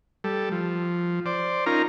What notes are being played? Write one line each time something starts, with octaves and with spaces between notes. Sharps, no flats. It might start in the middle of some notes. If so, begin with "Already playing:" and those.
G3 A4
F3
C5 D5
C#4 D#4 F4 A#4 A#5